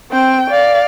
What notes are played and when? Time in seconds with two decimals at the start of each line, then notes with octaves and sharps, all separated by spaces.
0.11 C4 G5
0.50 D5 F5